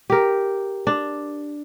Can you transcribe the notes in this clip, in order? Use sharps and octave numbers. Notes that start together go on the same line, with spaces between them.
G4 A#4
D4